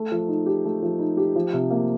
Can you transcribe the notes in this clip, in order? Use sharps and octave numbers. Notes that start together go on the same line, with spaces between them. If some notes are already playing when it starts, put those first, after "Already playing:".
Already playing: A3
F3
D#4
G4
A3
F3
D#4
G4
F3
C3
A#3